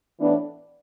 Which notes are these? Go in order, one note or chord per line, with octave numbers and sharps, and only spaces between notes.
A2 E3 B3 D4